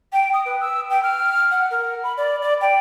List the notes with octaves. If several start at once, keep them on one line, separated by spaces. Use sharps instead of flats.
G5
D#6
B4
E6
G5
F6
F#5
A#4
B5
D5
D5
G5